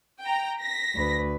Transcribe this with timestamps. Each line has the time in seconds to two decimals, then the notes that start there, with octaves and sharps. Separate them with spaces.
0.23 G5 A#5
0.61 A#6 B6
0.95 D2 B4